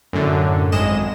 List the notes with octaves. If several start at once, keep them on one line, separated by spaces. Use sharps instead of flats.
F#2 A2 D3
G#1 G#3 D#5 E7